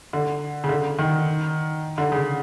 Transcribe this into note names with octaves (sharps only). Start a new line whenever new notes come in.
D3
C#3
D3
D#3
D3
C#3